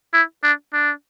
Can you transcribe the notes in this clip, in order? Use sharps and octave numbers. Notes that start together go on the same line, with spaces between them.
E4
D4
D4